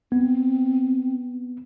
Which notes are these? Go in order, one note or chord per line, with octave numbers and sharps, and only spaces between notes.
B3 C4